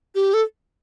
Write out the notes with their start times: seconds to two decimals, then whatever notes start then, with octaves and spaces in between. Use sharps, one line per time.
0.15 G4
0.34 A4